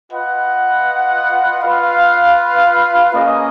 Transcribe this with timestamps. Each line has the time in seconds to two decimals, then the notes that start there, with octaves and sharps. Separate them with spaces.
0.11 F4 B4 D#5 F#5
1.62 F4 B4 F5
3.14 A#3 C#4 G#4 D#5